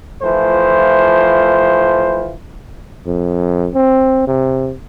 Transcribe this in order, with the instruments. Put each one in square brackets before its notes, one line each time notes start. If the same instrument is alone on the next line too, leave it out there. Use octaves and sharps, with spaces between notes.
[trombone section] E3 F3 A3 F4 C5
[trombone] F2
C4
C3